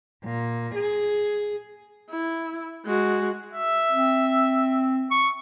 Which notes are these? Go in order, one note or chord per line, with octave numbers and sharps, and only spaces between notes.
A#2
G#4
E4
G#3 F#4
E5
C4
C#6